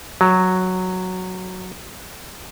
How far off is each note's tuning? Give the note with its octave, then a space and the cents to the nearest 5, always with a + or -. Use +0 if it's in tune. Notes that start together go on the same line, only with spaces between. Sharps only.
F#3 -5